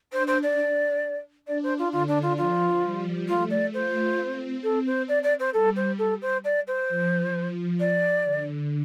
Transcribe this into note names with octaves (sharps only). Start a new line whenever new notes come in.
D4 C5
C5
D5
D4 D5
C5
F4
D3 F4
D4
F4
F3 F4
G3
A3 F4
D5
F4 C5
C4
C4 A4
C5
D5
D5
C5
G3 A4
C5
A4
C5
D5
C5
F3
D5
D3